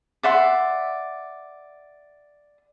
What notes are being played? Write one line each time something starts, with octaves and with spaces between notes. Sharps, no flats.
D5 E5 F#5 C6